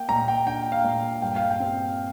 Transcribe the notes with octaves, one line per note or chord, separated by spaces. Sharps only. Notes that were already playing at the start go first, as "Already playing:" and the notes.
Already playing: A#3 G5
A#2 A#5
G5
D4 G5
F5
A#2
G2 G5
F5
G5
C4